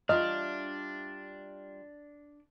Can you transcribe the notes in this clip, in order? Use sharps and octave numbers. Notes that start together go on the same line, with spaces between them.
G3 D4 F4 D#5 E5 F6